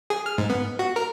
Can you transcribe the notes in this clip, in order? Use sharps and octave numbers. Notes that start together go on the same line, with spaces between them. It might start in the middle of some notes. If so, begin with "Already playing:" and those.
G#4
F6
G#2
B3
F#4
A#4